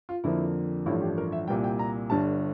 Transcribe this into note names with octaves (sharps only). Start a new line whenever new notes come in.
F4
F2 D3 F3 A#3 E4
A1 G2 F3 A3 E4
G4
A#4
E5
C2 A#2 G3 G5
G5
A#5
G1 G2 D3 A5